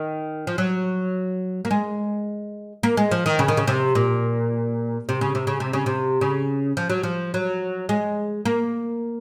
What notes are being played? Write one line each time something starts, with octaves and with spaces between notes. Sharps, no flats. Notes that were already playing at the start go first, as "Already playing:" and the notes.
Already playing: D#3
F3
F#3
A#3
G#3
A#3
G#3
F3
D#3
C#3
D#3
C#3
C3
A#2
C3
C#3
C3
C#3
C3
C#3
C3
C#3
F3
F#3
F3
F#3
G#3
A#3